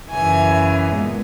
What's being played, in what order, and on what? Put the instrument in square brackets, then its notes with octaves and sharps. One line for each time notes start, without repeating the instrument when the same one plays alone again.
[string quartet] F#2 C#3 E3 G#5
A#2 G#3 B3